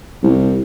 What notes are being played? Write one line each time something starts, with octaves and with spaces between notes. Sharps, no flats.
C2